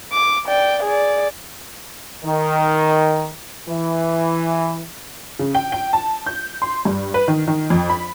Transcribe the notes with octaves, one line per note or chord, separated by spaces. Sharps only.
D6
D5 G5
G#4 D5
D#3
E3
C#3
G5
G5
A5
G6
C6
G2
B4
D#3
D#3
F2
B5